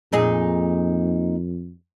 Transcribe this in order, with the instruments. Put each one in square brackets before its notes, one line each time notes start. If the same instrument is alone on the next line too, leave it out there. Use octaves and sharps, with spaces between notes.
[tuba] F2 [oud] A#2 D#4 G#4